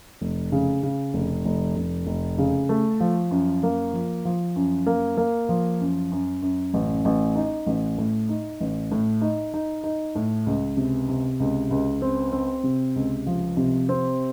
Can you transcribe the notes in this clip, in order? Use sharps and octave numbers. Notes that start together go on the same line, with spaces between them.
F1
C#3
C#3
F1
F1
F1
F1
C#3
A3
F3
F#2
A#3
F3
F3
F#2
A#3
A#3
F3
F#2
F#2
F#2
A1
A1
D#4
A1
A2
D#4
A1
A2
D#4
D#4
D#4
A2
C#2
C3
C3
C#2
C#2
C4
C4
C3
C#2
F3
C3
C4